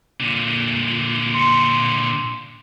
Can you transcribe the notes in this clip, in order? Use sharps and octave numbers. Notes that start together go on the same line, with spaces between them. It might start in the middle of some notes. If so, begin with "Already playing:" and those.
A#2 D3
C6 C#7